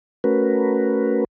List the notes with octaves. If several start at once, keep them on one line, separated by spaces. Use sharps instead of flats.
A3 C#4 F#4 A#4 B4